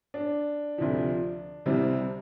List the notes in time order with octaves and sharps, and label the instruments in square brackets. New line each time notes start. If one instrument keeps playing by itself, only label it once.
[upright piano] D4
D2 C3 F3
C2 C3 G3 C4